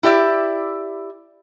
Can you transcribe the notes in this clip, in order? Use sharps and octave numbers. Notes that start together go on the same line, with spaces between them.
E4 G4 D5 E5